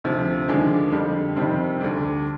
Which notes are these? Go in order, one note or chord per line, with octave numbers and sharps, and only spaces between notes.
D2 C3 F3
D#2 D3 F3 G#3 D4
F2 D3 G3
F2 C3 D#3 G3 C4
D2 D3 G3 D4